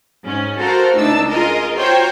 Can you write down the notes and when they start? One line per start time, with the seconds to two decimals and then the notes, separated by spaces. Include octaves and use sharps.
0.24 G#2 C#4
0.59 F#4 A4 A#4 C5 F5 A#5
0.97 C#2 A2 D4 D#4 A5 E6
1.30 F4 G#4 A#4 D#5
1.75 F4 F#4 C5 C#5 G5 A#5